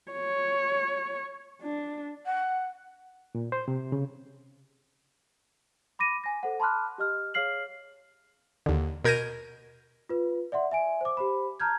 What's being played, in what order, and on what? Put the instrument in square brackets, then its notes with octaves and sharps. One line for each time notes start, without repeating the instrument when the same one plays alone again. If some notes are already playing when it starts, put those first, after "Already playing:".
[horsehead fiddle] C#5
D4
[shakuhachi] F#5
[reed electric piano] A#2
C5
C3
C#3
[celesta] B5 D6 A#6 D#7
G#5 A#6
A4 C5 F#5
A5 B5 C6 D6 F6 F#6
G4 D#5 F6
G#4 C#5 F5 F6 C7 F#7
[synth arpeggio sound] D#2 D3
B2 A#4 G6 G#6 A#6 D#7
[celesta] F4 B4
D5 E5 F#5 C6
E5 G#5 D7
C5 D6
G4 C5 B5
A5 A#5 F6 G6 G#6